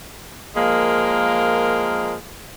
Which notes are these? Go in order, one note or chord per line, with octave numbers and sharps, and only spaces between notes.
F3 G#3 A#3 A#4